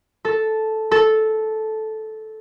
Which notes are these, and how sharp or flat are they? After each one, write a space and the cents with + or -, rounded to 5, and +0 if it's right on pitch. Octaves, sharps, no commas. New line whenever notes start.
A4 -5
A4 -10